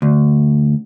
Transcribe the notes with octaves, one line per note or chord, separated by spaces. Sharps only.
D2